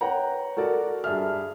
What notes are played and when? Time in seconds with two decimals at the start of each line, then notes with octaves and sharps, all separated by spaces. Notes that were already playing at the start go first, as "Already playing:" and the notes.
0.01 B4 C#5 F#5 G5 A#5
0.57 F#4 A4 A#4 D5
1.04 G2 G#4 E5 F6